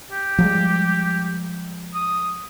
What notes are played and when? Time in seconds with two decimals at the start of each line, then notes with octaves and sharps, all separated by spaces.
0.11 G4
0.38 F3 G3 G#3
1.94 D#6